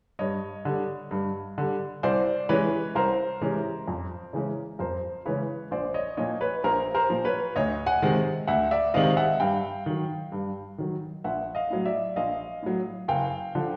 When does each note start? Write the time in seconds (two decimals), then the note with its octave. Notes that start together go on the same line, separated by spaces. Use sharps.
0.19 G2 C#5 D#5
0.65 D3 G3
1.11 G2
1.58 D3 G3
2.03 C2 C5 D5
2.49 C3 E3 G#3 C#4 B4 C#5
2.95 C2 A#4 C5
3.41 C3 E3 G#3 C#4
3.88 F2
4.33 C#3 E3 G#3 C#4
4.79 F2 A#4 C5
5.26 C#3 E3 G#3 C#4 B4 C#5
5.71 A#1 C5 D5
5.94 C#5 D#5
6.17 A#2 F3 C#5 D#5
6.41 B4 C#5
6.64 A#1 A#4 C5
6.95 A#4 C5
7.10 A#2 F3
7.25 B4 C#5
7.56 D2 C#5 D#5
7.86 F#5 G#5
8.02 C3 D#3 G#3 C4
8.47 D2 E5 F#5
8.71 D5 E5
8.94 C3 D#3 G#3 C4 D#5 F5
9.17 E5 F#5
9.40 G2 F5 G5
9.86 D#3 F#3
10.32 G2
10.78 D#3 F#3
11.24 A#1 E5 F#5
11.55 D#5 F5
11.70 A2 F#3
11.85 D5 E5
12.16 A#1 D#5 F5
12.62 A2 F#3
13.08 F#1 F5 G5
13.55 D3 F3